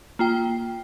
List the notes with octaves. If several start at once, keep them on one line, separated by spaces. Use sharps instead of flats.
A#3 F4 G5